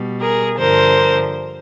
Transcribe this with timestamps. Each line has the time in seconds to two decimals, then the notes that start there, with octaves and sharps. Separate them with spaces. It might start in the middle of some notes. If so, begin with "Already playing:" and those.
Already playing: B2 G3
0.20 G#4 A#4
0.59 G2 D3 F3 A#4 C5